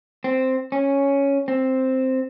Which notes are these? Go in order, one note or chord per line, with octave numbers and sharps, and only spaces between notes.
C4
C#4
C4